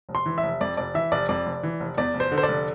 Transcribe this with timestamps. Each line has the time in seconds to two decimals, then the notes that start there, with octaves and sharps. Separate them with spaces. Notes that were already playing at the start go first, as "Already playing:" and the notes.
0.09 F1
0.15 C6
0.26 E3
0.38 E5
0.43 F1
0.61 F2 D5
0.77 F1 D5
0.94 E3 E5
1.12 F1 D5
1.29 F2 D5
1.46 F1
1.63 E3
1.80 F1
1.98 E2 D5
2.14 F1
2.20 C5
2.32 D3
2.38 C5
2.43 D5
2.48 F1